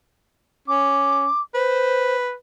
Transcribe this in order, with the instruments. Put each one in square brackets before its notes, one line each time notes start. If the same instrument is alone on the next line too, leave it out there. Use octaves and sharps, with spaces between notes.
[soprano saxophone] C#4 [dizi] D6
[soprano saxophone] B4 [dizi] C5